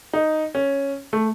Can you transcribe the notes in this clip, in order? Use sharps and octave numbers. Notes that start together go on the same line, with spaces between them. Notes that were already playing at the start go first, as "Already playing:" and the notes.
D#4
C#4
A3